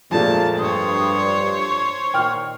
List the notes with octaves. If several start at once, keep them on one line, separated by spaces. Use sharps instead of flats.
F2 A#2 G#3 A3 A5
G2 C5 C#5 D#6
B4
C#6
A#2 D#3 G5 F6